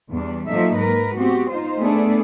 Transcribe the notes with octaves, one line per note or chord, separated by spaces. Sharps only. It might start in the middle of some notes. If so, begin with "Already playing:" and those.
E2 G3 B3 D4
F3 F#3 A#3 D#4 A4 E5
G#2 A#4 B4
B3 C4 F#4 G4
D#4 F4 C5
A3 B3 D4 G#4 A4 D5